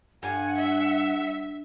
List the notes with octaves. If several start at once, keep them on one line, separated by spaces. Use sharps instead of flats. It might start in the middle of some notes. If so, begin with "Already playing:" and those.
G2 F#5 G#5
E5